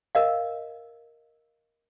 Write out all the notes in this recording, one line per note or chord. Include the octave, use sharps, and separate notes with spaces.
A#4 D#5 F5